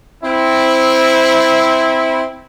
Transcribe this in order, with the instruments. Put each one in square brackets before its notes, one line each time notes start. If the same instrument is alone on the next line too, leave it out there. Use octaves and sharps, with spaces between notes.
[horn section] C4 E4